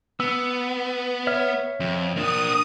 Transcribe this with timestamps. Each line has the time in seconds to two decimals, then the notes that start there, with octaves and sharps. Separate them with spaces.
0.20 B3 E6
1.27 C#5 E5 F6
1.80 F2
2.16 A#3 D4 D#6